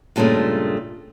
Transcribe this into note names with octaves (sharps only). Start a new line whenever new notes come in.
G2 A#2 C#3 G#3 A3